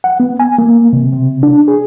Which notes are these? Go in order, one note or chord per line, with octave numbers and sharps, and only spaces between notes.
F#5
B3
G#5
A#3
C3
C3
D4
G#4